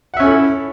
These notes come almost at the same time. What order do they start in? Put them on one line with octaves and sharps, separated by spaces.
F#5 E5 C#4 A4 E4